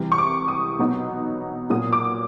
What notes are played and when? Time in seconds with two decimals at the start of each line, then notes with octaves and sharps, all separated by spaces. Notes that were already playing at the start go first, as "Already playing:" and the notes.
Already playing: C3 E3 G3
0.12 C#6
0.18 D6
0.48 D#6
0.79 B2 F#3 B3 D#4
1.70 A#2 F#3 B3 D#6
1.93 D6